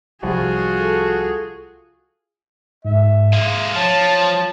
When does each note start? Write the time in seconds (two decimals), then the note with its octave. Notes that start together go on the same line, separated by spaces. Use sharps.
0.23 C2 F3 G3 F4 F#4 G#4
0.78 A4
2.85 G#2 E5
3.33 G#3 A#3 F5
3.75 F3 C#5 A5